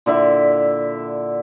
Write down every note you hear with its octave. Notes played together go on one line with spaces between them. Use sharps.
A#2 D3 E4 E5